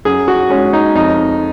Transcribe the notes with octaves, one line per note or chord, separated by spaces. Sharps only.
F#2 G#4
F#4
G#3 C#4
D#4
F2 D#4